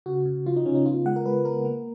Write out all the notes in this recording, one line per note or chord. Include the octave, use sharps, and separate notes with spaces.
C#3 F#4
C#3
F3 F4
D#4
C#3 C#4
D#4
B3 F4
G#3 F#5
A#4
G#3 B4
B3 A#4
A#3